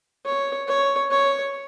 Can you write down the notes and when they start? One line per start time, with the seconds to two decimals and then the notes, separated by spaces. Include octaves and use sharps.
0.26 C#5
0.68 C#5
1.11 C#5